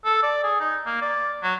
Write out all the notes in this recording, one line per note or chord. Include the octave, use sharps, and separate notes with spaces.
A4
D5
G#4
D#4
A#3
D5
F#3